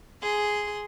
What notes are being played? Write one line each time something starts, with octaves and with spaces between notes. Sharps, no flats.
G#4 C6